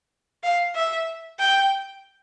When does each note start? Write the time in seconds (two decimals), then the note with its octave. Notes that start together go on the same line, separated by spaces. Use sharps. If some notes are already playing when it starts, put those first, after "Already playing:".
0.43 F5
0.75 E5
1.39 G5